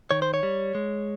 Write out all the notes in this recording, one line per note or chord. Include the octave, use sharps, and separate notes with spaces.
D#3 C#5
C5
C#5
G3
G#3